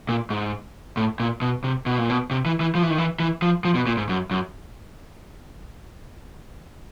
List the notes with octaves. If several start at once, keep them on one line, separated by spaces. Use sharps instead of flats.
A#2
G#2
A2
A#2
B2
C3
B2
A#2
B2
C3
E3
E3
F3
E3
D#3
E3
E3
F3
F3
B2
A#2
G#2
F#2
F#2